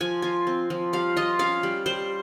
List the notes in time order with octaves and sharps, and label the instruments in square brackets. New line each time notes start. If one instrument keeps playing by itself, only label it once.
[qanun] F3 G#5
F4 G#5
C4
F3
G3 F5
F4 D#5
C#4 F5
G3
G3 C5